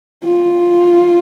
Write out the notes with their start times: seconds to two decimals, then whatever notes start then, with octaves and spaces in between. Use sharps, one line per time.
0.24 F4